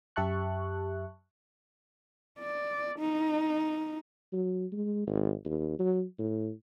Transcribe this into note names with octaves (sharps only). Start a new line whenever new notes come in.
F#2 G4 E5 A5 C#6 F#6
D5
D#4
F#3
G#3
G#1
D#2
F#3
A2